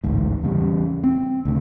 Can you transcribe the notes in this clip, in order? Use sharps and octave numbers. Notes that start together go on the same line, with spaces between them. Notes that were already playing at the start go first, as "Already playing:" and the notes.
A1 D2 G#2
E2 C#3 G3
C4
D2 C#3